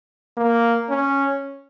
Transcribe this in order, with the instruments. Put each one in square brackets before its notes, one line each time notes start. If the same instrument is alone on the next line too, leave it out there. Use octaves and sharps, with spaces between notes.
[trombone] A#3
C#4